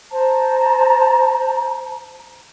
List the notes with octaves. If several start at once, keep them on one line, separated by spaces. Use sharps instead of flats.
C5 A5 A#5